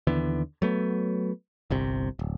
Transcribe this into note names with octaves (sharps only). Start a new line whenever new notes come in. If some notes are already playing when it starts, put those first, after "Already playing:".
D#2 D3 E3 B3
F#3 A3 B3
G1 C2 C3
D1